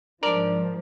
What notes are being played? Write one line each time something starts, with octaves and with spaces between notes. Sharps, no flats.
G#2 F3 D4 A#4 D5